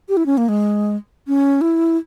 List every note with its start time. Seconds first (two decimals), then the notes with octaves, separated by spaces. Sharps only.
0.09 G4
0.17 E4
0.26 C#4
0.37 A#3
0.49 G#3
1.28 C#4
1.61 E4